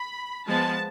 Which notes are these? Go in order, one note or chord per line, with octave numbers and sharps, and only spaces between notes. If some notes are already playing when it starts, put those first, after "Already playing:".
Already playing: B5
F3 G#3 B3 A5